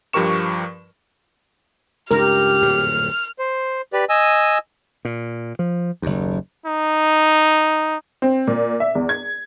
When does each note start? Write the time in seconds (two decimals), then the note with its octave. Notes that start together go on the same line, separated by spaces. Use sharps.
0.13 G2 F3 G4 A#4 C#6 E7
2.11 C#2 G2 G4 A#4 F6
2.62 D1 F2 A#2
3.39 C5
3.93 G4 B4 D5
4.09 D#5 G#5 E6
5.05 A#2
5.59 F3
6.02 F#1 D#2
6.66 D#4
8.22 C4
8.47 A#2
8.80 E5
8.95 E2
9.09 G#6